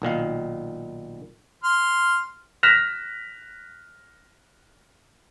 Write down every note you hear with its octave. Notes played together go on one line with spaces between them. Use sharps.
B1 A#2 D#3 F5
C6 F6
F6 F#6 A#6 B6 E7 F7